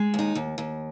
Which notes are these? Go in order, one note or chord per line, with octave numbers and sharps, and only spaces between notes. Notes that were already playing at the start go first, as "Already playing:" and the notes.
Already playing: G#3
D#2 D#4
D#2
D#2